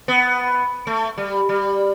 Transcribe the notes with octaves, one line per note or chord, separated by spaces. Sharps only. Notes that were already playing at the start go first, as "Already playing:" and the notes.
B3
A3
G3
G3